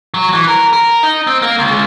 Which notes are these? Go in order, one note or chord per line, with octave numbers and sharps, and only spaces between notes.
F#3
E3
A#4
A#4
D#4
C4
A#3
C#2